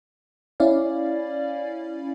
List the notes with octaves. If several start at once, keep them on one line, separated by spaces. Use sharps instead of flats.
C#4 E4 D5 F5